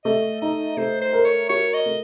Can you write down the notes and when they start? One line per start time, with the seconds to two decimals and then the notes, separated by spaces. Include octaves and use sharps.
0.05 A3 D#5
0.41 D#4 D#5
0.77 A3 C5
1.01 C5
1.13 A#4
1.25 C#5
1.49 F#4 C#5
1.74 D#5
1.86 A3